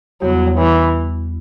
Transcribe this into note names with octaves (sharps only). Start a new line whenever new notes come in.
E2 C#3 F#3 G3 B3
E3